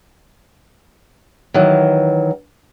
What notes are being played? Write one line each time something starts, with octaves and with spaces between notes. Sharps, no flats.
D#3 E3 F#3